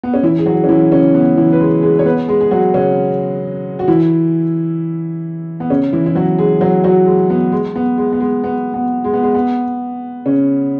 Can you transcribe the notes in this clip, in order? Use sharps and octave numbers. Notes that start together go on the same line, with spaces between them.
B3
C#4
E3 E4
G#4
F#3 F#4
C#4
E3 E4
C#3 C#4
B3
E3 E4
B4
G#3 G#4
G#3 G#4
C#5
B3 B4
G#3 G#4
G#4
F#3 F#4
C#3 C#4
F#4
E3 E4
B3
C#3 C#4
E3 E4
E4
F#3 F#4
G#3 G#4
F#3 F#4
F#3 F#4
G#3
B3
G#3
B3
G#3
B3
G#3
B3
B3
G#3
B3
G#3
B3
C#3 C#4